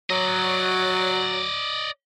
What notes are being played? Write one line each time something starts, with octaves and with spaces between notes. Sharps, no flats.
F#3 D5 D#5